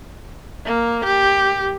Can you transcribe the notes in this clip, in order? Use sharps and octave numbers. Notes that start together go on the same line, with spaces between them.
A#3
G4